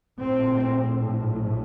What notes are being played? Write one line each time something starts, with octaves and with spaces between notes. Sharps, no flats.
A#1 A2 C4